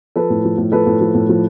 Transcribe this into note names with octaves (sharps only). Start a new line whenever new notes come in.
F3 A4 B4
A2
F3
A2
F3 A4 B4
A2
F3
A2
F3